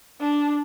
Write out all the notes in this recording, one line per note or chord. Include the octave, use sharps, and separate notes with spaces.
D4